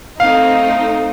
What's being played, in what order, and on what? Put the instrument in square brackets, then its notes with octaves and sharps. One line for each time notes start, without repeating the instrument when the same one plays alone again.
[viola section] A3 C4 D#4 [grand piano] F5